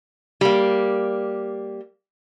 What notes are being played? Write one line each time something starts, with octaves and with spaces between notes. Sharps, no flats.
G3 A#3